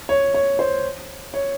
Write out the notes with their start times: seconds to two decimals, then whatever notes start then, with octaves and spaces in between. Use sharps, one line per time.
0.09 C#5
0.34 C#5
0.59 C5
1.34 C#5